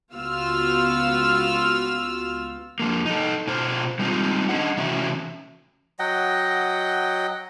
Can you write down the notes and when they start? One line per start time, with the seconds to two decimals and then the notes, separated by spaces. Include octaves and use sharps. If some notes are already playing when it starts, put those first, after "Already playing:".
0.13 C#2 B3 F4 F#4 E6 F6
2.80 F2 F3 A#3
3.05 D#4 A4
3.47 B2 F4 C5
3.99 G3 G#3 C4 D#4 F4
4.49 C#4 D4 D#5 F#5
4.77 C3 E3 C#4 F#4 E5
5.99 F#3 D#5 F#5 G5